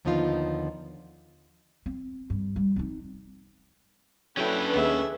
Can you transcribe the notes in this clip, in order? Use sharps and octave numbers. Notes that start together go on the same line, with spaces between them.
D#2 D3 F3 B3 D#4 F4
C4
G2
G3
C4 D#4
F#3 C#4 D4 E4 A4 B4 G5
D#2 B3 G#4 E5